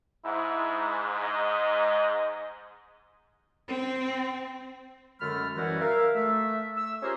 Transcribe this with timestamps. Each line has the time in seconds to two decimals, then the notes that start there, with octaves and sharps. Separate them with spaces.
0.25 G#2 E4
1.23 D#5
3.68 C4
5.20 F#2 D3 G#3 A3 B5 F6
5.56 F#2 E3 G3 D#4 E4 F#4
5.80 A#4 E5 F5
6.15 A3 E5
6.77 E6
7.03 C#4 F4 G4 G#4 A#4 C5